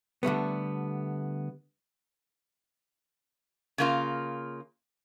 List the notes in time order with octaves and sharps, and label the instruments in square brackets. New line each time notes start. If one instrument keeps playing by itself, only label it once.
[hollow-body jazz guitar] D3 G3 A3 B3
[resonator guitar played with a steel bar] C#3 A#3 F4